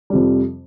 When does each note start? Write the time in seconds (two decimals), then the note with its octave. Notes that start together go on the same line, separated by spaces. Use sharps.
0.10 F2 C3 G3